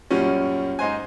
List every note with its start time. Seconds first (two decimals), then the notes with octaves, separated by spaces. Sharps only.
0.10 F#2 A#2 F3 G3 C#4
0.79 G#2 D#4 C5 G#5